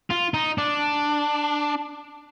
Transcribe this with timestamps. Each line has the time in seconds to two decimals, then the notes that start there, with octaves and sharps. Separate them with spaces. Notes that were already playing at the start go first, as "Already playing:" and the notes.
0.11 F4
0.34 D#4
0.58 D4